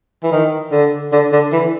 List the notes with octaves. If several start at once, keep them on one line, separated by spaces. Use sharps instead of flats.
E3
D#3
D3
D3
D3
E3